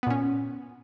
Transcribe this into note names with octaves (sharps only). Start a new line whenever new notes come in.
A#2 B3 C#4